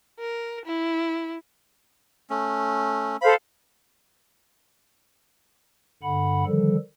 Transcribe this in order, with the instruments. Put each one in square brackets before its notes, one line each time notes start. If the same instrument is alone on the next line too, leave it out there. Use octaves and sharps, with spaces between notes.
[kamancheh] A#4
E4
[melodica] A3 C#4
[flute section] A4 C5 F5 [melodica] B5
[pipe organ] G2 D3 F#5 B5
D3 D#3 F3 G3 A4